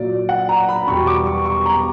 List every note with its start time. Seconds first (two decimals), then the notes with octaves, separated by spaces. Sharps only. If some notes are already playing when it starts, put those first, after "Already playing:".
Already playing: A#2 F#3 D5
0.29 F#5
0.49 A#5
0.69 B5
0.87 E2 B2 G3 C#6
1.07 D6
1.26 C#6
1.46 C#6
1.66 A#5